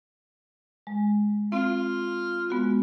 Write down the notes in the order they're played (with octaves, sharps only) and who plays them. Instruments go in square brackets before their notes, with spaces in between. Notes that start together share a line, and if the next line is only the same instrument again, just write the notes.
[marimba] G#3
[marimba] C4 [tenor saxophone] F4
[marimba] G#3 B3 F#4